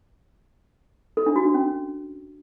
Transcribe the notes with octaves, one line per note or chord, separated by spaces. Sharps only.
A4
D4
F#4
D4
C#4